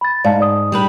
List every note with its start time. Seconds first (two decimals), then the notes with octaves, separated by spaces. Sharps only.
0.01 B5 A6
0.24 G#2 D5 F5 A5
0.40 D5 D#6
0.72 G3 D4 B4